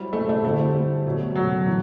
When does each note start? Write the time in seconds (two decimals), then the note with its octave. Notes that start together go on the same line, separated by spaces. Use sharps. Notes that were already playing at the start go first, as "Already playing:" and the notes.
Already playing: F#3 G3 C4 E4
0.13 A3
0.29 A3
0.44 D3 G3 A3 C4 E4
1.06 B2 F#3 A3
1.35 F#3
1.66 E3